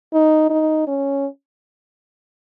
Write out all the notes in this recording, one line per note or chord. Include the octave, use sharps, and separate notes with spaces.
D#4
D#4
C#4